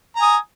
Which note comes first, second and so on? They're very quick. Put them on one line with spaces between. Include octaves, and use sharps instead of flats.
A#5 G#5 D#6